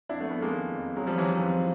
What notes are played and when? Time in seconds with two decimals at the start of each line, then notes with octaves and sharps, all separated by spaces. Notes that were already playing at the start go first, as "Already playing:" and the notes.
0.09 F2 D4 E4
0.20 A3 B3
0.31 F2 A3 B3
0.42 G#3 A#3
0.53 D#3
0.74 F2
0.96 F2 F#3 G#3
1.07 F3 G3
1.18 D#3 E3 F#3
1.29 F3
1.40 F2